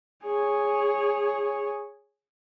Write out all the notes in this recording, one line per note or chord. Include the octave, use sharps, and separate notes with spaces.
G#4 C#5